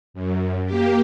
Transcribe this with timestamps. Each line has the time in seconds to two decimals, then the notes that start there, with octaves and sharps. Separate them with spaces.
0.14 F#2
0.66 A#3 G4